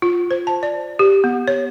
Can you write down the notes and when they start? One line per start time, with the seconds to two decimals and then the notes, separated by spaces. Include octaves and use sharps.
0.02 F4
0.31 C5
0.47 A5
0.63 D5
0.99 G4
1.24 B3
1.48 C#5